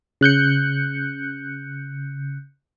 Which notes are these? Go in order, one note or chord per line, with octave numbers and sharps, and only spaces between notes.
C#3 F#6 G6 C#7